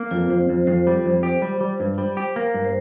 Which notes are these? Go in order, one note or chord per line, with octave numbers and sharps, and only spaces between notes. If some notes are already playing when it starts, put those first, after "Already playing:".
Already playing: A#3
F2 F4
F2 C5
F2
F2 C5
G3
F2
G4
G3
G3
G2
G3
G4
A#3 A#4
G2
C5